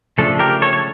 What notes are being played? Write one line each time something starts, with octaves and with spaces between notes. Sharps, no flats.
C#3 F3 A3 D4 A4
G4 A#4
A4 C#5
C#5